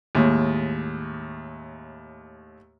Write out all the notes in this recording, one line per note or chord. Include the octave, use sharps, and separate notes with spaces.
D#2 A2 G#3